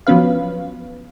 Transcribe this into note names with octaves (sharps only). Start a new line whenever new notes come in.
F3 F#3 B3 C#4 B4 F5